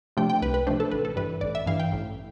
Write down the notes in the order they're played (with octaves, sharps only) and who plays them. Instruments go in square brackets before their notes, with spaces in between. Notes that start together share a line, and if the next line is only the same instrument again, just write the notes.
[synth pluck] C3 F3 A3 D4 G5
G5
C2 B4
B4
C3 F3 A3 D4 C5
A4
A1 B4
A4
G2 E3 B4
A1 D5
E5
G2 E3 F5
G5
A1